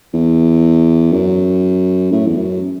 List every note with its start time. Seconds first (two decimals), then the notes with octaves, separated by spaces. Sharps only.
0.14 E2
1.12 F#2
2.12 A2
2.27 E2
2.37 F#2